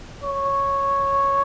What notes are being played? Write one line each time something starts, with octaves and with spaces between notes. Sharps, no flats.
C#5